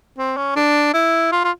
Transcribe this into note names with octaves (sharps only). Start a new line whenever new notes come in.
C4
C#4
D4
E4
F4
F4